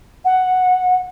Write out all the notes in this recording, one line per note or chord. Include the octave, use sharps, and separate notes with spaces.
F#5